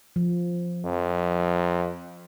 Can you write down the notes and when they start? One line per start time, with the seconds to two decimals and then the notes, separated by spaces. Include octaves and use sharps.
0.16 F3
0.84 F2